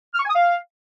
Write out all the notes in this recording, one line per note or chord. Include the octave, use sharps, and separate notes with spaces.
F6
C#6
G#5
D#6
F5